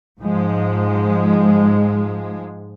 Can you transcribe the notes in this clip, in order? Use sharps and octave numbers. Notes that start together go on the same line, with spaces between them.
G#2 F3 G#3